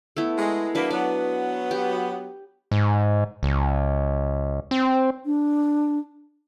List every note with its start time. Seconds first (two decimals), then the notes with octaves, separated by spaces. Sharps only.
0.16 A3 B3 E4
0.38 G#3
0.75 F#3 A#3 D4 E4 B4
0.91 F#3 B3 D5
1.71 G4
2.71 G#2
3.43 C#2
4.71 C4
5.26 D4